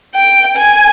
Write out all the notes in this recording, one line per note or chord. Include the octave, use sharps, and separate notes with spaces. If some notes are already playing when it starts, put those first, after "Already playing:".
G5
G#5